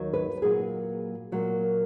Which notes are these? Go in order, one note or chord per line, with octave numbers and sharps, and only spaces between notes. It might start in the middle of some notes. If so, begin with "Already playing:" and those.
Already playing: D#2 D#3 F#3
B4
A#2 F#3 A#3 G#4
A#2 F#3 A#3